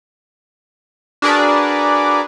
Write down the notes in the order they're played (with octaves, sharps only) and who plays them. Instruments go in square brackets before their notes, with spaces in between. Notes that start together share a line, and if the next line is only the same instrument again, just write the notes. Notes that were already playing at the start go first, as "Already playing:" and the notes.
[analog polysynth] D4 F#4 G#4 A#4 B4 D5